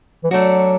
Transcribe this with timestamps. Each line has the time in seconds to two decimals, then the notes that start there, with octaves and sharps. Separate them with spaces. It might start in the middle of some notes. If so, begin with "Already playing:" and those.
0.24 E3
0.31 F#3 A3 D4 F#4